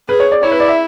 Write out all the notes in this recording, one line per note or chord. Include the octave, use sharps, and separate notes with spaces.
G#4 B4
C#5
D5
E4 C#5
B4
D5
E5